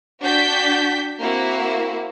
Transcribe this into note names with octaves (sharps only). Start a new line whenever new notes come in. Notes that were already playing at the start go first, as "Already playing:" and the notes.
D4 F#4 G5 G6 B6
A#3 C4 E4 F#4